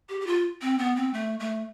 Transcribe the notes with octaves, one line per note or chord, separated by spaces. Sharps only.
G4
G4
F4
C4
B3
C4
A3
A3